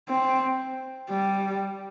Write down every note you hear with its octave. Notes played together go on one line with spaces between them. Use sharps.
C4
G3